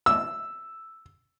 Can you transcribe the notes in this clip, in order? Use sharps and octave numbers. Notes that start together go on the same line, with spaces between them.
E6